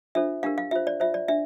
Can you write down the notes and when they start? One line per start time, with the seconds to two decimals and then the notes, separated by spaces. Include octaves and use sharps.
0.15 D4 F4 A4 C5 E5
0.43 D4 G4 A#4 F5
0.58 F5
0.71 F4 C5 E5
0.87 D5
1.00 F4 C5 E5
1.14 D5
1.28 D4 E5